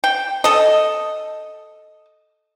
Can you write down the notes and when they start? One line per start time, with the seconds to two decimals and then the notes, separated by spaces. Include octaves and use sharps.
0.04 G5
0.44 A4 D#5